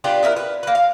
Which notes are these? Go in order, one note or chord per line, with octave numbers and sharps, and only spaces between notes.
B3 D4 F4 G4
B3 E4 G#4 A#4
B4
A#3 B4
F5